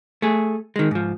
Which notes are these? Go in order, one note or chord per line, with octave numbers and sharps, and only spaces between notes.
A3 G#4
D#3 G#3
G#2 F3